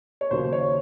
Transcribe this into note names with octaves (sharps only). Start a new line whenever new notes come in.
C#5
D#2 C#3 F#3 A#3 C5
C#5